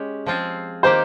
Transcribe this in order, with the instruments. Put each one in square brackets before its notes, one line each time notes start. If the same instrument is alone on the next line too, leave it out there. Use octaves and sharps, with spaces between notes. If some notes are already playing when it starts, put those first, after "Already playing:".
Already playing: [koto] G#3 C#4 G4
F3 C4 F4 G#4
[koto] D#3 A#3 D#4 G4 [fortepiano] C5